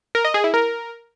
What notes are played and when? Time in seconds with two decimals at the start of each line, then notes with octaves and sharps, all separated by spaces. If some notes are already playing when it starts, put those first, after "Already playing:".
0.15 A#4
0.25 D#5
0.34 G#4
0.44 E4
0.54 A#4